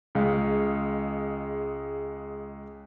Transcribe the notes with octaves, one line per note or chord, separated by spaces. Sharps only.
C#2 G#3 F5